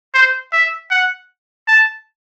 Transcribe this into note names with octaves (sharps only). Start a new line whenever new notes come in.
C5
E5
F#5
A5